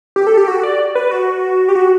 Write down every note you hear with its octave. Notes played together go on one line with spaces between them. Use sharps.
G4
A4
G4
F#4
D5
B4
F#4
G4
F#4